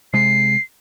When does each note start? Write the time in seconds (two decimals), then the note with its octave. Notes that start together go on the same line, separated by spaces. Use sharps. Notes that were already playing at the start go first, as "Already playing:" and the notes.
0.13 C3 G#3 C7